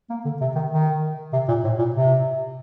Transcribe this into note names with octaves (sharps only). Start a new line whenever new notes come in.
A#3
D3
C3
D#3
D#3
C3
A#2
A2
A#2
C3